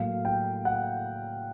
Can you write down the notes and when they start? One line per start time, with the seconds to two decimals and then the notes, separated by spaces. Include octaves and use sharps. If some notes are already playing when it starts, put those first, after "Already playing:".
Already playing: A2 F#3 A#3 F5
0.25 G5
0.65 F#5